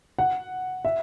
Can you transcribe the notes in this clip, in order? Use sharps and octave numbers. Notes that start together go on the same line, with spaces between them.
F#5
E5